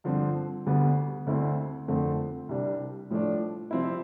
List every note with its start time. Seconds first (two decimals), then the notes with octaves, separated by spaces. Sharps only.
0.04 G2 D3 F3 C4
0.66 D2 D3 G3 B3 D4
1.27 D2 D3 A3 C4 E4
1.88 F2 D3 A3 C4
2.49 C2 C3 G3 D4
3.10 A2 F3 A3 D4
3.71 C3 F3 C4 E4